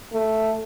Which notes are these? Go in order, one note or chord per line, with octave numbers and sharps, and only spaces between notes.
A3